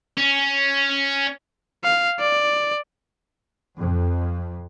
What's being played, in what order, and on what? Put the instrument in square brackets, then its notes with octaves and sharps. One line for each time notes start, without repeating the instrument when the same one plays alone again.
[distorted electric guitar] C#4
[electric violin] F5
D5
[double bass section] F2